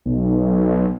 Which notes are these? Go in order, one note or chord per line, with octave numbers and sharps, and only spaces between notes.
B1